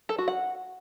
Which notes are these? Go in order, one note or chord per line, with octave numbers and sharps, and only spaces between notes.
A4
F#4
F#5